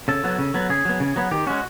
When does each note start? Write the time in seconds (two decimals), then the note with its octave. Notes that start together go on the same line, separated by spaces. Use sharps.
0.08 C#3 A4
0.24 F#3 B3
0.39 C#3
0.54 F#3 B3
0.70 C#3 G#4
0.85 F#3 B3
1.00 C#3
1.16 F#3 B3
1.31 D#3 G4
1.47 G#3 C#4 F#4